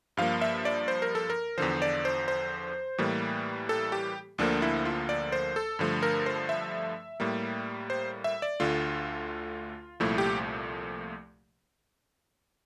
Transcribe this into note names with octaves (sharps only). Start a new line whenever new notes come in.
G2 F3 A#3 F5
E5
D5
C5
A#4
A4
A#4
E2 D3 F3 C5
D5
C5
C5
A2 E3 G3 A#3
A4
G4
D2 D3 F3 A#3 D4
E4
F4
D5
C5
A4
G2 D3 F3 A3
A#4
C5
E5
A2 G3 A#3
C5
E5
D5
D2 D3 A3 F4
C2 A#2 F3 A3 E4
G4